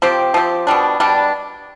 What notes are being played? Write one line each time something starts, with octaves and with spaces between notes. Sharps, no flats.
F3 C4 G4
F3 C4 G4
B2 G3 D4
B2 G3 D4